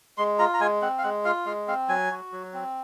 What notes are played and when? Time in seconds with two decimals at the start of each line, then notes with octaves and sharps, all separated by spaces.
0.18 G#3 C6
0.39 F4 A#5
0.54 A#5
0.60 G#3 G#5
0.82 C4 F#5
0.98 F5
1.03 G#3 F#5
1.25 F4 F5
1.46 G#3 F5
1.68 C4 F5
1.89 F#3 G#5
2.11 F#4
2.32 F#3
2.54 C4